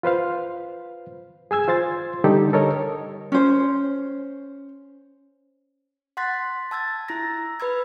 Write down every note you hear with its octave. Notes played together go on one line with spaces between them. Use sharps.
F4 B4 C5 F5
G#4 G#5 E6 G#6
F4 C5 C6 A6
D3 G3 D#4 G4 A4
A4 A#4 C#5 D#5
C#4 C5
F#5 C6 F#6 A6 B6
A5 E6 G#6 A6
E4 A#5 E6 A#6
B4 B5 E6 G#6